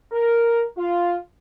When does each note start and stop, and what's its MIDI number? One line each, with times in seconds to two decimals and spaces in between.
0.12 0.63 70
0.77 1.16 65